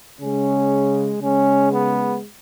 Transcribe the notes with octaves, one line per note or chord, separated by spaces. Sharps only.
C#3 G#3 C#4
C#3 G#3 C#4
B3